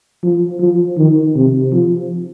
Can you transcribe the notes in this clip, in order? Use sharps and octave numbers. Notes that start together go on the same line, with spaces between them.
F3
F3
D#3
C3
F3